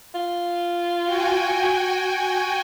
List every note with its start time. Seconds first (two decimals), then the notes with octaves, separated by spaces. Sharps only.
0.14 F4
1.04 F#4 G5 G#5